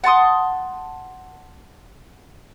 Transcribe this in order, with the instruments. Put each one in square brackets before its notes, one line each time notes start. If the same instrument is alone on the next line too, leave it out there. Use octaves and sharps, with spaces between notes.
[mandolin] F#5 A5 C6 D#6